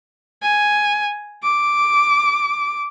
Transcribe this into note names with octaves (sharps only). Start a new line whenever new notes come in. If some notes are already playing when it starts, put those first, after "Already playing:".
G#5
D6